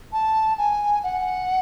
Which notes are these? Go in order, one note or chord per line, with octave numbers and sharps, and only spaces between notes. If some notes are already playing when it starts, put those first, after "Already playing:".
A5
G#5
F#5